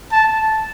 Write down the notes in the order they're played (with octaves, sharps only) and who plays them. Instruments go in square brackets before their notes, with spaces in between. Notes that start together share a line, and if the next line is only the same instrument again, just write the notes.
[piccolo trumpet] A5